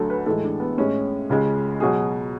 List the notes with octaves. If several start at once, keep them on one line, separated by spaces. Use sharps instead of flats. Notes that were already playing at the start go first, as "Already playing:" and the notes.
Already playing: D2 D3 F#3 A4
B4
A2 E3 G#3 A4
D4
B3
A2 G#3 C#4
C#2 C#3 G#3
B2 F#3 G#4